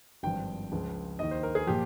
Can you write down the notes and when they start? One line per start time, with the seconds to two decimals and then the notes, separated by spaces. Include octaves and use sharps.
0.23 G#1 G2 F3 G5
0.72 C#2 C#3 F3
1.19 D#2 D#3 D#5
1.31 C5
1.43 A#4
1.55 G#4
1.67 A#2 F3 G4